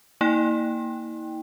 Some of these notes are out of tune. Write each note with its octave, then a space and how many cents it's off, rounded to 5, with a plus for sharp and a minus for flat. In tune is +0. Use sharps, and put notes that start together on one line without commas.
A#3 +0 E4 -45 G5 +0